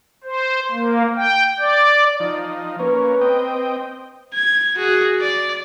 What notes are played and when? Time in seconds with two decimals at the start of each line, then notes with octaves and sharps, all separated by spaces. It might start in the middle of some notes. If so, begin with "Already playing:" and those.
0.24 C5
0.71 A#3
1.16 G5
1.59 D5
2.20 F3 D#4
2.79 A#3 C#4 B4
3.21 C4 D#5 G5
4.34 G#6
4.76 F#4 G#4
5.21 D5